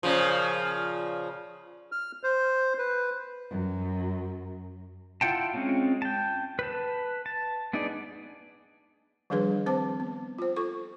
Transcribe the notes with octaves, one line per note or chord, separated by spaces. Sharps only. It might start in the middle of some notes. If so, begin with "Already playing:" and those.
A#2 C#3 F3
F6
C5
B4
F#2
E4 F4 F#5 G5 A5
G#3 C4 C#4 F4
G5 A5
B4 A5
A5
B3 D4 D#4 G#4 D5
D#3 F3 G3 D4 G#4 B4
C4 C5 A5 D6
B3
F4 C5
F4 A4 C#6